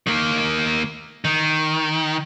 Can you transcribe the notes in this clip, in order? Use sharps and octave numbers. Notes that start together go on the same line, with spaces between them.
D#3 A#3
D#3